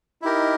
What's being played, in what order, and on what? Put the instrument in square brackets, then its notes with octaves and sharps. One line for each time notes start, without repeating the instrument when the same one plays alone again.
[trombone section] D#4 [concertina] E4 G4 A#4